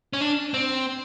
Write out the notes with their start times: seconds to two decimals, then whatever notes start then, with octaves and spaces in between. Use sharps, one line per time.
0.13 C#4
0.21 D4
0.54 C4